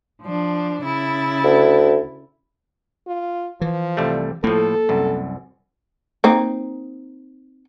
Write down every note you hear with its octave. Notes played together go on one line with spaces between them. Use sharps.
F3 D4
C#3 E4 A6
D2
F4
E3 F3
C2 G3 A3
A2 F3 A#3 A4
C2 F#2
A#3 C4 D#4